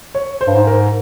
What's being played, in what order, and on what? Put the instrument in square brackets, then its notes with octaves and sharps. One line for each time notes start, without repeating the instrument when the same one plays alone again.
[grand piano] C#5
C5
[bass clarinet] G2
G#2
[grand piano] A#4